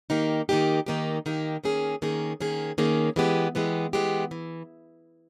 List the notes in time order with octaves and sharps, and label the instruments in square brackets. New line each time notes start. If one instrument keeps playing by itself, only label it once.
[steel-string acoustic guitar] D#3 A#3 D#4 G4
D#3 A#3 D#4 G4
D#3 A#3 D#4 G4
D#3 A#3 D#4 G4
D#3 A#3 C#4 G#4
D#3 A#3 C#4 G#4
D#3 A#3 C#4 G#4
D#3 A#3 C#4 G#4
E3 G#3 B3 G4
E3 G#3 B3 G4
E3 G#3 B3 G4
E3